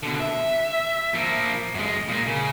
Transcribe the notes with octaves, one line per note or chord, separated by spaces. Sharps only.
B2 D3
E5
F3 A#3
F#2 G#3
A#2 A#3
C#3